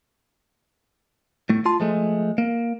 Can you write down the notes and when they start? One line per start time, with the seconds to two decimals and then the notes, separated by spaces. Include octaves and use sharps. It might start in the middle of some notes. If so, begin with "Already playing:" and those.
1.50 A2 A3
1.66 F4 A5 C6
1.80 F3 G#3 A3
2.38 A#3